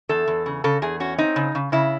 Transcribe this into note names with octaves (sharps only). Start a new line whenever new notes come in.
E2 A4
E2
C#3
C#3 A4
E2 G#4
C#4 F#4
C4 D#4
C#3
C#3
C#3 E4